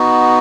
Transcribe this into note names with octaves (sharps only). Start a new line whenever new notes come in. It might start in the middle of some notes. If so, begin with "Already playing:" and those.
Already playing: B3 D#4 F#4